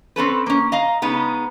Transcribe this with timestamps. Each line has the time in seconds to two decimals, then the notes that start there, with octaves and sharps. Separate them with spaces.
0.16 C4 C#4 A4 B4
0.46 A#3 C#4
0.72 D#5 F5 A#5
1.02 C#3 G#3 B3 D#4